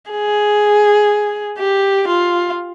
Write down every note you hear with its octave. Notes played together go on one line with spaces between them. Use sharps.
G#4
G4
F4